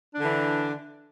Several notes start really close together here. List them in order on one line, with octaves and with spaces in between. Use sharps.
D4 D3 E3